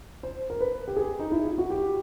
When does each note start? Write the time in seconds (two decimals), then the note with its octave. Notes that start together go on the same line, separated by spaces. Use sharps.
0.23 C5
0.50 A#4
0.60 B4
0.88 G4
0.97 G#4
1.19 D#4
1.32 E4
1.45 F4
1.58 F#4
1.70 G4